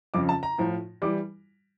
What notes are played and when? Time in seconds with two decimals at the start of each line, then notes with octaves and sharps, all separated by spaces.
0.14 F2 C#3 F3 D6
0.29 A5
0.43 A#5
0.58 A2 F3
1.02 E3 G3 D6